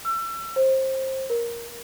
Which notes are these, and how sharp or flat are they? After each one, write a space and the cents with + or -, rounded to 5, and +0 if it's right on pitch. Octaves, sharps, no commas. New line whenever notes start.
E6 +35
C5 +20
A#4 +10